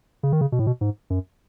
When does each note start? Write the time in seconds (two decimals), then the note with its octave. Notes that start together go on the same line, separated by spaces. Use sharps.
0.23 C#3
0.32 D#3
0.41 C#3
0.52 B2
0.59 A2
0.67 B2
0.81 G#2
1.10 F#2